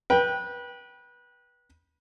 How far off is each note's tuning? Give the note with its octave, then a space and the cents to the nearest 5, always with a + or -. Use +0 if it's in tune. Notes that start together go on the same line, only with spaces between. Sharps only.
B4 -25 G5 +0